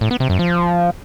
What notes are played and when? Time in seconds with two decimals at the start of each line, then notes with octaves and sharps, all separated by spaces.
0.01 A2
0.11 B3
0.20 C3
0.30 F#2
0.39 F3